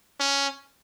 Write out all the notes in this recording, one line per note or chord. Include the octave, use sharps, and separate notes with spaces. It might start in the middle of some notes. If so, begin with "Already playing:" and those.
C#4